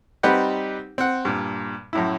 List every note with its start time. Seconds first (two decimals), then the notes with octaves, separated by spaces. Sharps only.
0.23 G3 C4 D#4 G4 B4 F#5
0.98 C4 F#5
1.25 G2 A#2
1.93 F#2 A2 E4